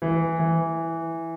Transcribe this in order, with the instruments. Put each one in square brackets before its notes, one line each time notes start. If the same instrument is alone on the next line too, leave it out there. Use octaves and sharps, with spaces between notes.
[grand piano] E3
E3